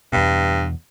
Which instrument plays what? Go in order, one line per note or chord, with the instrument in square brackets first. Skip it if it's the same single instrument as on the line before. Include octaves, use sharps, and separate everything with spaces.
[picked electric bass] E2 B2 [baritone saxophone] G2